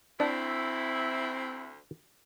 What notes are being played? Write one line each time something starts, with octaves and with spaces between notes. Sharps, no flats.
D2 C4 D4 E4